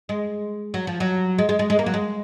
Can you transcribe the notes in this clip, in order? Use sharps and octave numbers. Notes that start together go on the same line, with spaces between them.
G#3
F#3
F3
F#3
G#3
G#3
G#3
G#3
A#3
F#3
G#3